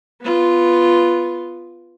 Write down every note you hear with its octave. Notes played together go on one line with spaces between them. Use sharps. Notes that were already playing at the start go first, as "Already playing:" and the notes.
B3 F4